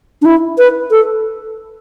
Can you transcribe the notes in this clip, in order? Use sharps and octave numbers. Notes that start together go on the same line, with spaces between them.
D4
E4
B4
A4